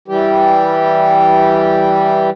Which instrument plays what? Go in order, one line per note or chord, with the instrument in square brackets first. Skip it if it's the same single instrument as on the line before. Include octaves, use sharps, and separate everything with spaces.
[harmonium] E3 G3 G4